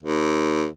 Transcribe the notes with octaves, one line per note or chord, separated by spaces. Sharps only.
D#2